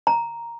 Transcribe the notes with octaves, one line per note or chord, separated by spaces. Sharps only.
A#5